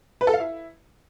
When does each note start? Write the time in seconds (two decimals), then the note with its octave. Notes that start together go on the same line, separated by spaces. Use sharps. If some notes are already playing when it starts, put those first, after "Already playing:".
0.21 B4
0.27 A4
0.34 F5
0.40 E4